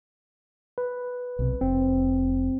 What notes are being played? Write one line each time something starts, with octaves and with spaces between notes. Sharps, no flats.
B4
B1 C3
F1 C4